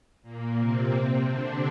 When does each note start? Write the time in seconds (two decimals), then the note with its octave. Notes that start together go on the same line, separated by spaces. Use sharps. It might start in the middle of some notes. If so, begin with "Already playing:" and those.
0.22 A#2 A#3
0.59 C3 C4
1.28 D3 D4